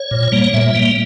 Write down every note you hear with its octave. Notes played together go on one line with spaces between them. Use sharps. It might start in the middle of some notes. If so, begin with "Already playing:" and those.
Already playing: C#5
A#2
G3 A#3
A#2 E5
G3 A#3